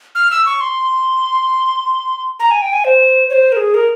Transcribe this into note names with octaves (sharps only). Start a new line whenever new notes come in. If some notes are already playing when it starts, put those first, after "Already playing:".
F6
E6
C#6
C6
A#5
G#5
G5
G#5
C5
C#5
C5
A#4
G#4
A#4